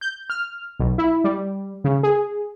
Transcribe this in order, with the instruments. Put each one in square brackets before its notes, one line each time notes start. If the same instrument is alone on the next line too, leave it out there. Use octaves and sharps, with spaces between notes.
[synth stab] G6
F6
B1
E4
G3
C#3
G#4